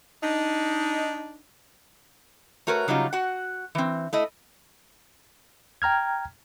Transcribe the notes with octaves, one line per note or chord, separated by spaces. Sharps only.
D4 D#4
A3 F#4 A#4 B4 C#5
C#3 F#3 G3 D#4 F4
F#4 F#5
E3 C4
A3 E4 D#5
G5 A#5 F6 G#6